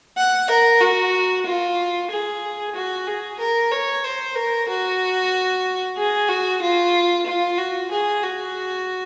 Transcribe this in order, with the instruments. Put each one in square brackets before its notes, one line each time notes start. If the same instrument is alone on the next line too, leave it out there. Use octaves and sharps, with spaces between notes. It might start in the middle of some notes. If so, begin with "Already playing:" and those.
[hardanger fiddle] F#5
A#4
F#4
F4
G#4
F#4
G#4
A#4
C#5
C5
A#4
F#4
G#4
F#4
F4
F4
F#4
G#4
F#4